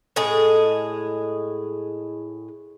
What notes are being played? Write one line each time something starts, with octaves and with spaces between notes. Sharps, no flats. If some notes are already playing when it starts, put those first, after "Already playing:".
A2 G#3 G#4